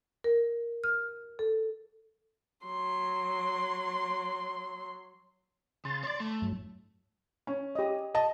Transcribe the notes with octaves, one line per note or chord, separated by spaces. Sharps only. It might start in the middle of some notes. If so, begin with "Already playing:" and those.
A#4
F6
A4
F#3 C6
C#3 C6 A6
C#5 D5
A3
G2 F#3
C#4
G4 D#5
D#5 A5